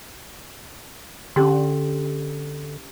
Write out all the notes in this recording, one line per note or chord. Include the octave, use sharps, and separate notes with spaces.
D3 C#4 G4 C6